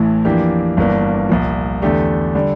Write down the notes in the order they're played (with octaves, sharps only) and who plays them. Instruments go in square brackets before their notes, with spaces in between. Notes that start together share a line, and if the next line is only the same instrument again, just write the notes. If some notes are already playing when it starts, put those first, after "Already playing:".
Already playing: [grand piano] A1 A2 E3
F2 E3 A#3 D4 G4
G1 G2 E3 A#3 D4
C2 A#2 F3
E2 D3 A3 D4 G4
D3 G3